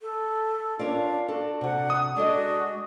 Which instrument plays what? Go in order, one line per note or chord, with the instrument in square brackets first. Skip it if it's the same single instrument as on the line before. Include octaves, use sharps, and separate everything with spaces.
[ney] A4
[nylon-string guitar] C#4 A#4 D5 [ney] D4 [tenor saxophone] F4
[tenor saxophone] D4 [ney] F#4 [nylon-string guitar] A4
[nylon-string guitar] C3 F#4 [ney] F#5
[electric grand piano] D#6
[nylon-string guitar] G#3 A4 D#5 [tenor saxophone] D4 [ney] F#4